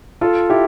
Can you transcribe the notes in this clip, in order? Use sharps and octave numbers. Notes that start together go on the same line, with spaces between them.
F4 A4
E4 G4